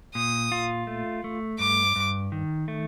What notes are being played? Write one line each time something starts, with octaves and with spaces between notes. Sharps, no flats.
A#2 D#6
F4
A3
A3
G2 D6
G2
D#3
A3